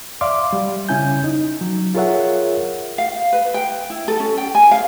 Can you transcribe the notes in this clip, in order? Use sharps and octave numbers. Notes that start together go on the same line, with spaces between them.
D5 E5 F5 C6 D6
G3
C#3 C#4 E4 G#5 G6
D#4
F#3
F4 G#4 A#4 C#5 E5 F#5
F5
B4
G5
E4
A4
C#4
G5
G#5
F5